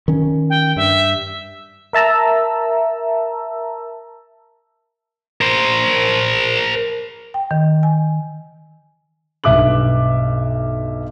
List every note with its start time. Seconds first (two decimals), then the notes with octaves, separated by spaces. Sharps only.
0.08 D#3 C#4
0.50 G5
0.76 G2 E5
1.93 A#4 E5 A5 A#5 E6
5.41 A#4 C5
7.34 G5
7.51 D#3
7.83 G#5
9.44 B1 G2 E5 D6 F#6 F#7